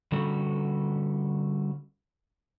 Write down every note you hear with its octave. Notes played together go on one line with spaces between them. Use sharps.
D3 G3 C#4 F#4 A4